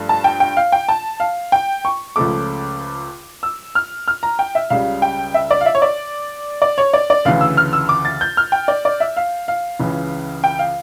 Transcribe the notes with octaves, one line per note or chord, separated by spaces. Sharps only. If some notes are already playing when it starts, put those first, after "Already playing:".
Already playing: G2 F3 A3
A5
G5
G5
F5
G5
A5
F5
G5
C#6
C#2 C#3 F3 A3 D6
E6
F6
F6
A#5
G5
E5
C#2 C#3 G3 F5
G5
E5
D5
F5
E5
C#5
D5
D5
C#5
D5
D5
D2 C#3 E3 F5
E6
F6
E6
D6
A6
G6
F6
G5
D5
D5
E5
F5
F5
C#2 C#3 E3
G5
F5